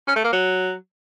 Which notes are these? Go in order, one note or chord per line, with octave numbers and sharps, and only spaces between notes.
C#4
A3
A#3
F#3